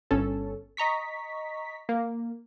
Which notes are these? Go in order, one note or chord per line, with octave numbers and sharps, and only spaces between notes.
G1 C#4 A4
D#5 A#5 C#6 B6
A#3